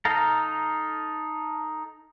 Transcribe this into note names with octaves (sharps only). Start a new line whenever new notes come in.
D#4 A4 F5 A#5